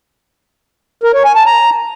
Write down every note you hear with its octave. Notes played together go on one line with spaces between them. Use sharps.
A#4
C#5
G#5
A5
A#5